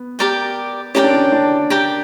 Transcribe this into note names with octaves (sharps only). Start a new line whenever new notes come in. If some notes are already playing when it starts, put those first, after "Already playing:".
Already playing: B3
G4 A#4 D5 G5
C#4 G4 A#4 D5 G5
D4
C#4
D4
G4 A#4 D5 G5